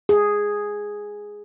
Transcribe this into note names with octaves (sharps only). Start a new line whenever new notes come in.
G#4